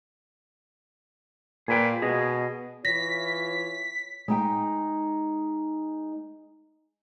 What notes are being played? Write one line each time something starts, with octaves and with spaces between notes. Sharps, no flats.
A#2 G#4 B4 G5
B2 G#4 D#5
E3 F4 C#5 A#6 B6
G#3 D#4 G5